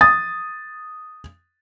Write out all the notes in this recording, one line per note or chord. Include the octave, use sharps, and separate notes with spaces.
D#6 A6